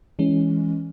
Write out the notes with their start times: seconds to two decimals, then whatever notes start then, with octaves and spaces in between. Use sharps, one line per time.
0.19 E3 G#3 C#4